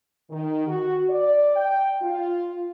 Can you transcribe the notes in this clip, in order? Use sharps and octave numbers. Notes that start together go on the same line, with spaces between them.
D#3
F#4
D5
G5
F4